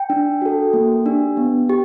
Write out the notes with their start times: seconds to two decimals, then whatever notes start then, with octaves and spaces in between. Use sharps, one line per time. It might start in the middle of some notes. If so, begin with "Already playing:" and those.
Already playing: G5
0.10 D4
0.42 F#4 A4
0.74 A#3
1.06 D4 G4
1.37 B3
1.69 G4